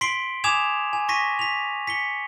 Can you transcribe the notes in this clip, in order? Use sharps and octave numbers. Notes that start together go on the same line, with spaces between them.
C6 B6 C7 D7 F#7 G7
G#5 D6 D#6 G#6 E7 F7
G#5
C#6 A#6 B6 D#7
B6 F7
B6 C#7 G7